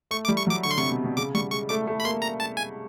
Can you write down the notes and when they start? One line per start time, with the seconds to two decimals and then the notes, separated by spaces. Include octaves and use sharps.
0.11 A3 C#6
0.25 D6
0.28 G3
0.37 C#6
0.47 F#3 D6
0.63 D3 C#6
0.71 C6
0.77 C3 C#6
0.90 B2
1.04 B2
1.17 C#3 D6
1.34 G3 C#6
1.52 G#3 C#6
1.69 A3 D6
1.87 A3
2.00 B5
2.04 A#3 C6
2.22 A#5
2.40 A5
2.57 G#5